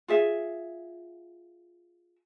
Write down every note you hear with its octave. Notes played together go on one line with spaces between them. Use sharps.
F4 G#4 E5